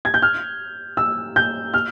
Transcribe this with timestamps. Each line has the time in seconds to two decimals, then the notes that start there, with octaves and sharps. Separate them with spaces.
0.05 G#6
0.14 G6
0.22 F6
0.97 E6
1.36 G6
1.74 F6